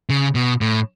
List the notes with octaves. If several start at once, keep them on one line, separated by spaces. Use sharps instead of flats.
C#3
B2
A2